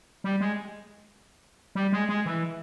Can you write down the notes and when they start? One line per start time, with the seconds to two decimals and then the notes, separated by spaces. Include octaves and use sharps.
0.24 G3
0.41 G#3
1.75 G3
1.92 G#3
2.09 G#3
2.26 E3